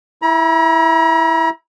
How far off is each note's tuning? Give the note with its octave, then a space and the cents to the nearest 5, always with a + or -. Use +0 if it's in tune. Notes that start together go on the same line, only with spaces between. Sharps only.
E4 -5 A#5 +45